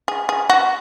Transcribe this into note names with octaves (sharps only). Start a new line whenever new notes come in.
G#4
G#4
F#4